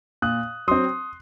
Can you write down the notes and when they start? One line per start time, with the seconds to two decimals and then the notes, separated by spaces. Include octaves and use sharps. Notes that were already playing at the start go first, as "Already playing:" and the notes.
0.22 A#2 D#6 F#6
0.68 F#3 C4 C6 D#6